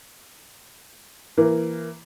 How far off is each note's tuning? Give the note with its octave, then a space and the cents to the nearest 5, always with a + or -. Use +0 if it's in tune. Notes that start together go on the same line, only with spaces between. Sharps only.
E3 +10 A#3 +0